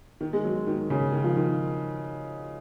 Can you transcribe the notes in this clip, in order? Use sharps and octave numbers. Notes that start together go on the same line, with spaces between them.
D#3
G#3
F#3
D#3
C#3
D#3
F3
D#3